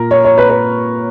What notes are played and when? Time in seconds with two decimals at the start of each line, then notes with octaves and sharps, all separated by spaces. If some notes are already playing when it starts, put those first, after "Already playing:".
Already playing: A#2 A#4
0.11 C#5
0.25 C#5
0.38 B4
0.50 B4